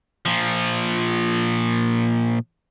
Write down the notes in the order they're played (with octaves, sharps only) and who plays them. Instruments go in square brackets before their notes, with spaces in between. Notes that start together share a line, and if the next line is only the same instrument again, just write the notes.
[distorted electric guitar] A#2 F3